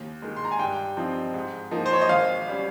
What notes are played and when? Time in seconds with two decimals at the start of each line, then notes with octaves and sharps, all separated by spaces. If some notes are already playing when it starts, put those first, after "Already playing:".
Already playing: D#2
0.22 D#3 G#3
0.37 C6
0.45 A#5
0.52 G#5
0.59 G2 G5
0.97 F3 C4 D#4
1.34 G#2
1.71 F3 A#3 D#4
1.86 C5
1.93 C#5
2.01 D#5
2.09 G#1 F5
2.48 G3 C#4